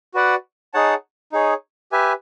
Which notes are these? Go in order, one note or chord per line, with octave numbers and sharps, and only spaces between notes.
F#4 B4 D5 F#5
D#4 G#4 C#5 F#5 A5
D#4 G#4 C#5
G4 B4 E5 G#5